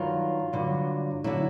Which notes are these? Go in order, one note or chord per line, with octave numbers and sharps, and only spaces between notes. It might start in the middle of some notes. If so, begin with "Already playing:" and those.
Already playing: G2 D#3 F#3 F4
G2 D3 F#3
D3 F#3 E4